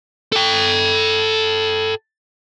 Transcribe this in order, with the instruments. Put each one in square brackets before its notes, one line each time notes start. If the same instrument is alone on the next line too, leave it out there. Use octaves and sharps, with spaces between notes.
[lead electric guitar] A4 G5